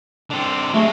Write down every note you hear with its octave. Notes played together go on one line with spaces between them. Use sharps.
D3 C4
F#3 G#3 A3